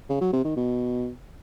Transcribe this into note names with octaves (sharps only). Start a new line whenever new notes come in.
C#3
F#3
C3
D#3
B2